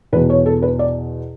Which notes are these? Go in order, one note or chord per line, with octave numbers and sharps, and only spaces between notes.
E2 B2 B4
C#5
A4
B4
D5